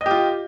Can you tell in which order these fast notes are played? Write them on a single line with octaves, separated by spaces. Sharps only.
D#5 G4 F4